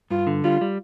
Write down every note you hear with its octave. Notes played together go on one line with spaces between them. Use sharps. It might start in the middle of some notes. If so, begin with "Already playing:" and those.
G2 F4
D3
G3 F4
G3